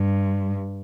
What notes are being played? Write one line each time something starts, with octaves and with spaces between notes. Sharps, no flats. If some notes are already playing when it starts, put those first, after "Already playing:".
Already playing: G2